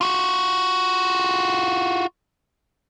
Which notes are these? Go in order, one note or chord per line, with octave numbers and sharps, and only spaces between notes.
F4 F#4